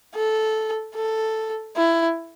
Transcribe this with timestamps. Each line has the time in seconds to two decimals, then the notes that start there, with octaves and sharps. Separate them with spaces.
0.15 A4
0.95 A4
1.76 E4